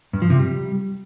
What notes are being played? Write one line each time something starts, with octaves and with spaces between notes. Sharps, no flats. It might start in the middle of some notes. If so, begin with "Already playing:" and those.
G2
F3
C3
G3